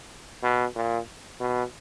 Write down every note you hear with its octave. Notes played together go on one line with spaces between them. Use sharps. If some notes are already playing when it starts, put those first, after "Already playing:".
B2
A#2
B2